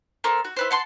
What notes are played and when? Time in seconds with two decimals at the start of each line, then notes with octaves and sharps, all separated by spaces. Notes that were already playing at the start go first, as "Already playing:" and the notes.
0.24 A#3 A4 C5
0.45 F#4
0.57 E4 B4 C5
0.71 F#5 A5 C6